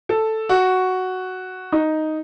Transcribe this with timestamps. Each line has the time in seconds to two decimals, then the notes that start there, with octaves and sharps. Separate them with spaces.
0.09 A4
0.49 F#4
1.72 D#4